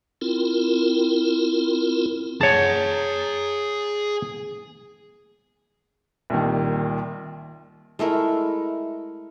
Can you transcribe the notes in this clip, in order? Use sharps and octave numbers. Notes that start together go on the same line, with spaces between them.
C4 E4 F4 A#4
G#4 C#5 F#5 A5
C2 A#2 D#3
G#3 A3 E4 A#4